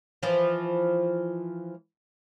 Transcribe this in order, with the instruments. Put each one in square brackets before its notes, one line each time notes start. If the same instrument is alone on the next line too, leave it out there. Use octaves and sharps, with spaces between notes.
[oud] E3 F3